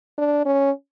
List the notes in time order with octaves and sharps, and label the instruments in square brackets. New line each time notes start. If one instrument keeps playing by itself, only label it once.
[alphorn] D4
C#4